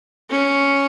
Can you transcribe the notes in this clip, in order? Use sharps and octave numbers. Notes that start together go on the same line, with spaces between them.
C#4